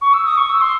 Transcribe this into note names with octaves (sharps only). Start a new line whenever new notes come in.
C#6
E6
D#6
C#6
E6
C6